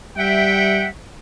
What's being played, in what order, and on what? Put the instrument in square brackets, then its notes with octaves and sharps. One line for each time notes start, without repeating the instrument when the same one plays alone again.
[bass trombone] G3 [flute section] E5 [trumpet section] F#5 G5